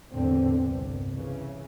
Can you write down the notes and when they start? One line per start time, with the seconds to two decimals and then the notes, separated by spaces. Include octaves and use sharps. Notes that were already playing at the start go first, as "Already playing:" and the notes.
0.11 E2 A2 D3 C4
0.60 G1 C2
1.12 C#3 E3